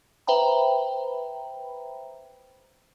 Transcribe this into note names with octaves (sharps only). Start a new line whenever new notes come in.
B4 C5 E5 G5 A#5 B5